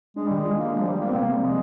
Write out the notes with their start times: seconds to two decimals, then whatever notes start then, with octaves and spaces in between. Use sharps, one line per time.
0.16 G#3 D4
0.28 D#3 G3
0.38 G#3
0.44 F4
0.59 G3 A#3
0.72 G#3 D4
0.81 F3
0.87 D#3 G3
1.00 G#3 A#3
1.09 C4
1.15 C3 A#3
1.29 G3 C4
1.43 F3 G#3